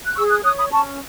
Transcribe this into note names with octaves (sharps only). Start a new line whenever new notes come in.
F#6
G#4 C#6 E6
D#6 F#6
C#5 D#6 F#6
B5 D#6
C#4 A5 C#6